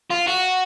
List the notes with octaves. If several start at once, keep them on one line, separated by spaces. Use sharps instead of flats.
F4
F#4